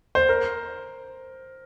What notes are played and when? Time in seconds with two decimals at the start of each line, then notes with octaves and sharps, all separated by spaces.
0.15 C5
0.29 A#4